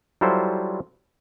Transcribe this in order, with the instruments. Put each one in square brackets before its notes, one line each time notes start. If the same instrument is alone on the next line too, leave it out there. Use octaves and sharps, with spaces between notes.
[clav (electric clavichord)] F#3 G3 E4 F4 A4 C5